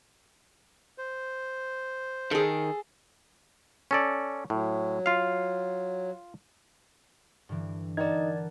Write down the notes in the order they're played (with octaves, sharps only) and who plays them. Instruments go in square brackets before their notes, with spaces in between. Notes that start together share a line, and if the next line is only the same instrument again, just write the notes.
[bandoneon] C5
[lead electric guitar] D#3 [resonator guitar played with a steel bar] G#4 A4
[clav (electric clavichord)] C#4 A4 D5
[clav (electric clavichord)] A2 [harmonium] F#3
[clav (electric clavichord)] F4 F5
[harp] G2 D3 E3
[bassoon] D#4 [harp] A#4 F#5 A5 [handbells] D5 G#6